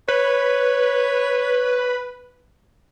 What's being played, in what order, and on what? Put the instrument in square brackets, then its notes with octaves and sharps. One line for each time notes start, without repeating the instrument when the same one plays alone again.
[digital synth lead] B4 [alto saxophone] C#5